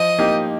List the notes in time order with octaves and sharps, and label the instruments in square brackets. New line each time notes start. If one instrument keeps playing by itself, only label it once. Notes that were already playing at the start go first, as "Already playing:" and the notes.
Already playing: [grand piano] F3 [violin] D#5
[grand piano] A#3 D#4 G4